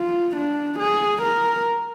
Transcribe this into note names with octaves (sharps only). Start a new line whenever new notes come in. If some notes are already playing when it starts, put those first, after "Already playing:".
Already playing: F4
D4
G#4
A#4